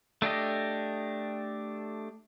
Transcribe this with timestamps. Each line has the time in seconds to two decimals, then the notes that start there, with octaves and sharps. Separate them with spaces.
0.22 A3 D4 G4 D#5